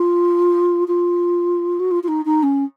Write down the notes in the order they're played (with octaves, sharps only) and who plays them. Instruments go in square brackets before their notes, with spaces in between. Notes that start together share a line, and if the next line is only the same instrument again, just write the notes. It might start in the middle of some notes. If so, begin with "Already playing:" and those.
Already playing: [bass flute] F4
F4
F#4
F4
F4
D#4
D#4
C#4